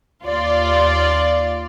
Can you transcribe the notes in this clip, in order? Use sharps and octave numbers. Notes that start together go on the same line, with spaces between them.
D#2 F4 D5